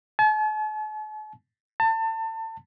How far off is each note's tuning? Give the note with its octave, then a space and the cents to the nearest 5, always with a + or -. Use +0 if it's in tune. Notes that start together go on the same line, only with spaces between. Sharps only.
A5 -45
A5 +30